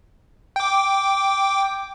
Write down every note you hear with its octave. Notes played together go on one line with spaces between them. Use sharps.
G5 D6